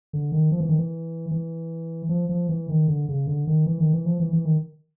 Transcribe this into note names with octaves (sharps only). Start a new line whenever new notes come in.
D3
D#3
F3
E3
D#3
E3
E3
F3
F3
E3
D#3
D3
C#3
D3
D#3
E3
D#3
E3
F3
E3
E3
D#3